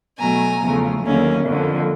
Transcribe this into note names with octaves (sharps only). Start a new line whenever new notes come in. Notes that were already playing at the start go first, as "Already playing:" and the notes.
B2 F#3 A3 G#5 A#5
E2 C#3 F3 A3
D#2 D3 F#3 A#3 C#4
F2 D3 F3 A#3